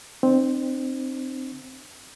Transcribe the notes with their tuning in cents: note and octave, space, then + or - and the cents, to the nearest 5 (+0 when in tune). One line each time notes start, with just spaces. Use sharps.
C4 +0 D#4 -45